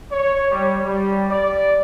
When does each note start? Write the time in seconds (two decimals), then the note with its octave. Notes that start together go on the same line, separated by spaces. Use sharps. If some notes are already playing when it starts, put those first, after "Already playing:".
0.12 C#5
0.51 G3
0.85 G3
1.30 D5